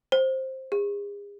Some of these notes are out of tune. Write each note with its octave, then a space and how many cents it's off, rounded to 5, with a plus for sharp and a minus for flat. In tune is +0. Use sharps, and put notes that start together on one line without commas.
C5 +10
G#4 -40